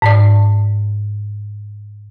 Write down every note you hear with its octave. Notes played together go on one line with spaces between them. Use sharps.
G#2 D5